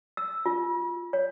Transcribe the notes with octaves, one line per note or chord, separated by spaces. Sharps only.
E6
F4
C#5